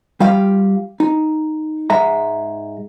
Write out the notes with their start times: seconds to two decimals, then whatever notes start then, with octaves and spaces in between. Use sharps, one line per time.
0.20 G3 F4 G4 F5
1.00 D#4
1.90 G#2 G#3 E5 A#5